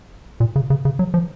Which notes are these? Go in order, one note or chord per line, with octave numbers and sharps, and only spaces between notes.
A#2
C#3
C#3
C#3
F#3
F3